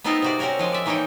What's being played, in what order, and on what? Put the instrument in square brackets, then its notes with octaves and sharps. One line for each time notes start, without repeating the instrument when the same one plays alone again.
[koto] B3 C4 D#4 F4 A4 A#4
C3 F#4 D5
C4 C#4 F#4 A#4 C#5
F3 G#3 G#5
D5 E5
E3 A#3 D#4 C#5 G5